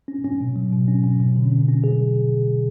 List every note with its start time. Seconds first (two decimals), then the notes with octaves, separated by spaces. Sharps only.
0.08 C#4
0.24 C#4
0.41 B2
0.56 F#3
0.72 B2
0.88 C#4
1.04 C#4
1.20 B2
1.36 D3
1.52 D3
1.68 C#4
1.84 G#4